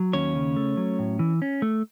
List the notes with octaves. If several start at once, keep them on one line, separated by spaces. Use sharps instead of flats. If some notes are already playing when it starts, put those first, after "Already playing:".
Already playing: F#3
D#2 C#4 C#5
C#3
A3
F#3
A2
E3
C#4
A3